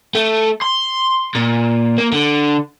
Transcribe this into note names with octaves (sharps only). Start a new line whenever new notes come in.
A3
C6
A#2
A#3
D3